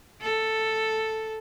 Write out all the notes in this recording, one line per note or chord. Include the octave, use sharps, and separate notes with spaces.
A4